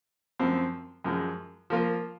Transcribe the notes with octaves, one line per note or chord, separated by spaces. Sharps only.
F#2 F3 C4
F#2 F3 G#3
F3 A#3 F4